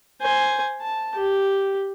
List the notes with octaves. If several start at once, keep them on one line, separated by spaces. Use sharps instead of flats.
C5 G#5
A5
G4